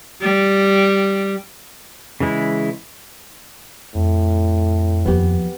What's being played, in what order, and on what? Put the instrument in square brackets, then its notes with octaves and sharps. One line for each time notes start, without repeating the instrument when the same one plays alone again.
[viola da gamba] G3
[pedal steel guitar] C#3 E3 G#3 E4
[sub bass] F2 [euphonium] A2
[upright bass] D#2 F3 [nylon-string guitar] B3 G4